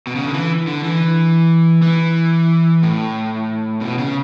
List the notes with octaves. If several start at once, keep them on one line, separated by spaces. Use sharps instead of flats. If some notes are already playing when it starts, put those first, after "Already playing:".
B2
C#3
D3
E3
D3
E3
E3
A2
B2
C#3